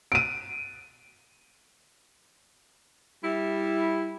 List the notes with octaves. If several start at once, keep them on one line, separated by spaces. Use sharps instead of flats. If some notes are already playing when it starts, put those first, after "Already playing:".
D7 D#7
G3 E4